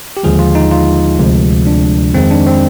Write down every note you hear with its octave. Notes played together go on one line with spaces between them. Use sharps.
G4
D#2 D3 F3 G#3 G#4
F4
D#4
F4
D2 C3 F3 G#3
D4
F2 D#3 G#3 C4
D4
C4